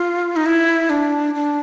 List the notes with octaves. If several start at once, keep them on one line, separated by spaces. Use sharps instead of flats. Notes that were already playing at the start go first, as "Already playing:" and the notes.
Already playing: F4
D#4
E4
D4
D4